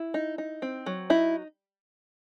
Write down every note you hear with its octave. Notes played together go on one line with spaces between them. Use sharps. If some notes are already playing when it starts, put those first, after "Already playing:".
Already playing: E4
D#4
D#4
C4
F#3
D#4 E4